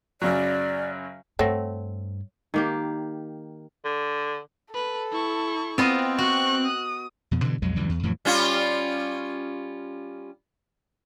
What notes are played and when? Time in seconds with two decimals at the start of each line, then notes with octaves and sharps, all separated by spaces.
0.22 F#2 C#3 F#3 D5
1.39 G2 A3 C4 C#5 F#5 A#6
2.54 D#3 A#3 G4
3.85 D3
4.74 A4 B4
5.11 E4 C#6
5.78 B3 C4 F4 D#5
6.19 F#4 C#6 F#6
6.66 D#6
7.31 F2 B2
7.43 G2 B2 D3 E3
7.62 B1 F2 F#3 G#3
7.76 C#2 F#2 E3 G3
7.89 E2
8.03 F2 A2 E3 F#3
8.25 G3 C#4 F4